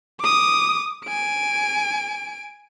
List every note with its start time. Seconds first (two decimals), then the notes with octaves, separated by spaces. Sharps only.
0.20 D6 D#6
1.06 G#5 D7